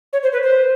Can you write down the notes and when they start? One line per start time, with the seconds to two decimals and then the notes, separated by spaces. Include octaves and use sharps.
0.13 C#5
0.23 C5
0.33 B4
0.43 C5